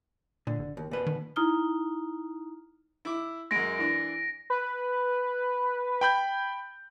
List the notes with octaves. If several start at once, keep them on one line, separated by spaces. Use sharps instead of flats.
A#2 D3
F#1
D#2
A#2 B4
D#3
D#4 E4 A#5 D#6 F6 G7
E4 D6
F#2 G#3 A#6 D7
E3 D4
B4
G5 B5 G6